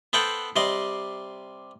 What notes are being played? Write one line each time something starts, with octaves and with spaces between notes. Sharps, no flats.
B3 A4 C5 F#5 G5
C3 G3 D#5 C6